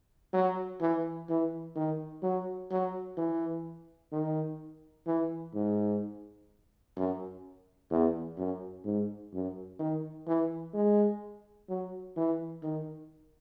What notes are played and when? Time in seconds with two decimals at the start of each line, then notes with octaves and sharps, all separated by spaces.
0.33 F#3
0.81 E3
1.29 E3
1.76 D#3
2.23 F#3
2.71 F#3
3.17 E3
4.12 D#3
5.06 E3
5.54 G#2
6.97 F#2
7.91 E2
8.38 F#2
8.85 G#2
9.33 F#2
9.79 D#3
10.27 E3
10.74 G#3
11.69 F#3
12.17 E3
12.63 D#3